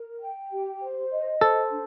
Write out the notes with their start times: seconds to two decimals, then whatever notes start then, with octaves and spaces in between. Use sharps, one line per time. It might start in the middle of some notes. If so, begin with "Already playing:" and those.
Already playing: A#4
0.21 G5
0.51 G4
0.81 C5
1.11 D#5
1.41 A4 C5
1.71 D4